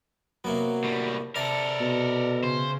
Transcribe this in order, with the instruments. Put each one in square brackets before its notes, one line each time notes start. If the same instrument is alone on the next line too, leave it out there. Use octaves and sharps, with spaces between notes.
[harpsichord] C3 A#3 B3 [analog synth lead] F#3
[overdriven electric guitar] A2 G3
[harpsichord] C3 A5 [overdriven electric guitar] A4 A#4 [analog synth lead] D5
[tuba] B2
[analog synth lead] C#3 [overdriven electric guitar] C5